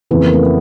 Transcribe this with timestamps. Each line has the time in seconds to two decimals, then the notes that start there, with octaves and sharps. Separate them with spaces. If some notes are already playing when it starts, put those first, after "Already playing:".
0.11 F2 C#3 E3 B3
0.21 A#3
0.33 A3 B3